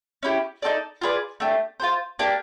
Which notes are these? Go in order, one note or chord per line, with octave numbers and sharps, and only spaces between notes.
C#4 E4 G4
D#4 F#4 A4 D5
F4 G#4 B4 D5
A3 D4 G4
F4 G#4 C5
A#3 D4 G4